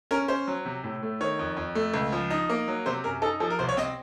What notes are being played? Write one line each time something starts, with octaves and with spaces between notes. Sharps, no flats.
C#4 A#4
C#4 C5
F#3
C3
A2
A3
D#3 C#5
F2
F2
A3
C#2
F3
D#4
A#3
F#3
C3 C5
F#2 A#4
D#4 A4
F3 A4
A#4
C2 C5
C#5
C4 D#5